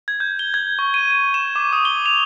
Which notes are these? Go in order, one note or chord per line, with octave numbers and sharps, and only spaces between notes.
G#6
G6
G7
G#6
C#6
D#7
D#7
E7
D6
D#6
G7
F7